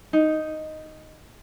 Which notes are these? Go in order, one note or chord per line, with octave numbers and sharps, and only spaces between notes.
D#4